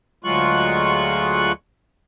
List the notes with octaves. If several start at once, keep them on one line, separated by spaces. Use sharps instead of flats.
D2 F#3 G#3 F4 C#6 F#6